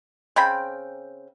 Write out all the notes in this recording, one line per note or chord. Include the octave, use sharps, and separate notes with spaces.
C#3 C4 G5 B5